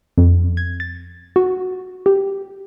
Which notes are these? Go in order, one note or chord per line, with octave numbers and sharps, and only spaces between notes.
F2
G#6
A6
F#4
G4